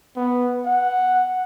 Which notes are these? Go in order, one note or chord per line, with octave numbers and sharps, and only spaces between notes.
B3
F#5